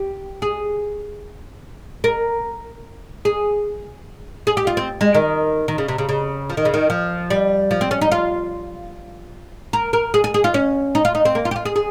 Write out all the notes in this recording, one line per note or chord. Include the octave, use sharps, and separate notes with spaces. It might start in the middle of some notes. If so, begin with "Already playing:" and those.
Already playing: G4
G#4
A#4
G#4
G#4
G4
F4
C4
G#3
D#3
D#3
C#3
C3
C#3
C#3
F3
D#3
C#3
D#3
F3
G3
F3
C4
C#4
D#4
F4
A#4
A#4
G#4
G#4
G#4
F4
C#4
D#4
F4
D#4
C4
A#3
F4
G4
F4
G#4
G#4